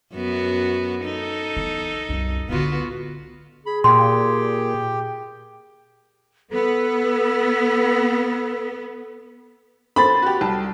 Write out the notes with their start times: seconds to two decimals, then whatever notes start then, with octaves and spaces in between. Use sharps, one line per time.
0.14 F#2 B3 F#4
1.04 D#4 A4
1.57 E3 B3
2.09 C2 F#2
2.49 A2 D3 B3 F4 F#4
3.66 G#4 B5
3.84 A#2 G4 G5 C6
6.51 B3 A4
9.96 A3 C5 B5 A6
10.22 F#4 G4
10.41 C2 A5